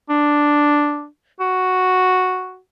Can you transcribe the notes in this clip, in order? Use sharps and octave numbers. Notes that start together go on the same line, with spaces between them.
D4
F#4